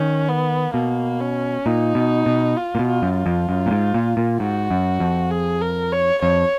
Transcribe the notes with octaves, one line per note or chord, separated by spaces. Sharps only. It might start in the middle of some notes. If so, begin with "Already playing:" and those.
Already playing: D#3 C#4
B3
B2 A#3
C#4
A#2 D#4
B2
B2
F4
A#2
B2
F4
F#2
F4
F2
F#2
A#2
G#2
A#2
A#2
G#2 F#4
F#2
F2
G#4
A#4
C#5
F2 C#5